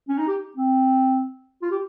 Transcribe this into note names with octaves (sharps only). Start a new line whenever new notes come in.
C#4
D#4
G4
C4
F4
G4